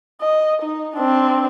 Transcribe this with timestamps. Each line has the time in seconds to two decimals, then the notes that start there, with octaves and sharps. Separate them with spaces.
0.21 D#5
0.62 D#4
0.96 C4 D4